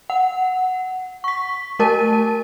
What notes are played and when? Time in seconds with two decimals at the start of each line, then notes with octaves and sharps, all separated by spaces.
0.10 F#5
1.24 C#6 B6
1.79 A3 A#4 A5 D#7